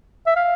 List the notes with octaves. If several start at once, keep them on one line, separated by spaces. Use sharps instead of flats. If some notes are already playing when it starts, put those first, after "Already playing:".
E5
F5